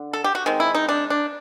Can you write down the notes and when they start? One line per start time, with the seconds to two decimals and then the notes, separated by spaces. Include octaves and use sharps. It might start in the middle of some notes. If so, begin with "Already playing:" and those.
Already playing: D3
0.13 A4
0.24 G4
0.35 F#4
0.46 D#3 G#3 C4
0.60 E4
0.75 D#4
0.89 D4
1.10 D4